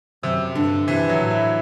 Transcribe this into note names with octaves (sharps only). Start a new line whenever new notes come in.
F#2 C3
G2 D3
C3 E3
F#3
A2
E4